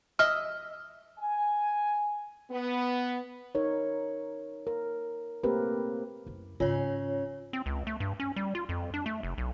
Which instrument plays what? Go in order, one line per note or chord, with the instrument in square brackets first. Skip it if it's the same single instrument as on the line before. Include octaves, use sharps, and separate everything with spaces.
[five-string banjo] D#5 E5 [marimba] F6
[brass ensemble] G#5
B3
[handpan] D#4 A#4 C#5
A#4
A3 A#3 C4 G4 A#4 B4
[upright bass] F#2 E4
[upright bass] G#2 C#3 [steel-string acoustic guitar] C#4 [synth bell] F4 C#5
[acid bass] C4
C#2
A3
G2
C#4
G3
F4
F2
D4
A3
F1
B1